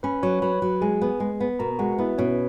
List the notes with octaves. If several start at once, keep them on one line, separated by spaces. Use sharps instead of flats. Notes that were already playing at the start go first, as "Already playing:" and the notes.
C#4 B4 B5
F#3 C#5 C#6
F#3 B4 B5
F#3
G#3 G#4 G#5
B3
G#3
B3
B2 A#4 A#5
G#3 F#4 F#5
B3 E4 E5
B2 C#4 C#5